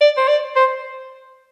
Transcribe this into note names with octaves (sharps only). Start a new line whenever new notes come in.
D5
C5
D5
C5